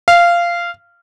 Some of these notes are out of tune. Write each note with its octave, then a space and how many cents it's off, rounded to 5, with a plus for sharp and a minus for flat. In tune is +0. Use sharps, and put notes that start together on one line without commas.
F5 -15